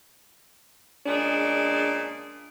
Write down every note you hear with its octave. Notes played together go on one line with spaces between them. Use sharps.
A#2 C#3 G#3 D4